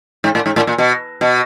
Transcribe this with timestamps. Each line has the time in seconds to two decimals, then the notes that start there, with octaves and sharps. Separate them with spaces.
0.24 G#2
0.35 A2
0.46 G#2
0.56 A2
0.67 A#2
0.78 B2
1.21 B2